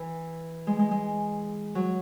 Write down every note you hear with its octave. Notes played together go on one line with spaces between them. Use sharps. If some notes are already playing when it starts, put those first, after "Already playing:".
Already playing: E3
G#3
G#3
G#3
F#3